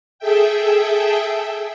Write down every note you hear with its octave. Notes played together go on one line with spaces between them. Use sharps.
G#4 A4 E5 G5